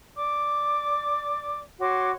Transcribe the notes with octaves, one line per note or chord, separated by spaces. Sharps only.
D5 D6
F#4 C#5 C6 D6